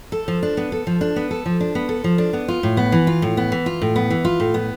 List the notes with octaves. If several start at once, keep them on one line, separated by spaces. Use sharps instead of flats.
A4
F3
D4
B3
A4
F3
D4
B3
A4
F3
D4
B3
A4
F3
D4
B3
F4
A2
B3
E3
F4
A2
B3
E3
F4
A2
B3
E3
F4
A2
B3